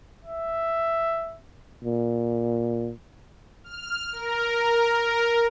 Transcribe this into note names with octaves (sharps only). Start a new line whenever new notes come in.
E5
A#2
F6
A#4